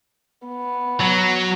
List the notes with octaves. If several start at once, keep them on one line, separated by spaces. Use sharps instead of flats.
B3
F#3